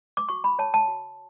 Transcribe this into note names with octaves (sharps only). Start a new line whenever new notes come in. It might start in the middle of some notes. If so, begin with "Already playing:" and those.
D6
F#4 C#6
B5
C#5 A5
A5
F#4